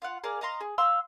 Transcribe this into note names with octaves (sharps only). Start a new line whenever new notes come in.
F4 F5 F#5
G#4 A#4 D5 F5
D#5 F5 A#5 C6
G#4
F5 C6 E6